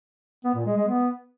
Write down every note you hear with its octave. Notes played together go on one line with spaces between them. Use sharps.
B3
A#2
G#3
G#3
B3